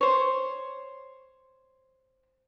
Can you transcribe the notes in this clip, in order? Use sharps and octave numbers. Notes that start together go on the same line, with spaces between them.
C5 C#5